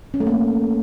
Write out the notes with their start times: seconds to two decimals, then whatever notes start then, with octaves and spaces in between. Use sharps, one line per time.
0.14 C#4
0.20 A3
0.27 A#3